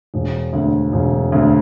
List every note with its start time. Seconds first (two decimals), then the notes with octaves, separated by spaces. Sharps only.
0.14 E1
0.53 D2 D3
0.92 E1
1.32 D2 D3